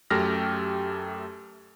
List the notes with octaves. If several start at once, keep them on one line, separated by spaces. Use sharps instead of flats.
F#2 A3 G4 A4 F6 A#6